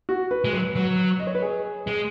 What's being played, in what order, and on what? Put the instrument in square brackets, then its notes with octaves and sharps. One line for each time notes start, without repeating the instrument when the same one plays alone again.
[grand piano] F#4
B4
[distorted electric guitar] G#3
[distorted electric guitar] F#3 [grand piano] B4
[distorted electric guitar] F#3
[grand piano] D#5
C#5
B4
G#4
[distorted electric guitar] G#3